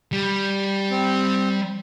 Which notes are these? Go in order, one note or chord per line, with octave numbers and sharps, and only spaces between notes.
G3
C4